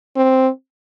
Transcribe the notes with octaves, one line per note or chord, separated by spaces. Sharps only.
C4